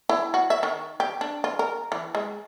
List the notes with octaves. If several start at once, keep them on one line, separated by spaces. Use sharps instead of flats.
E4
F#4
E5
D#3
G4
D4
F4
A#4
E3
G#3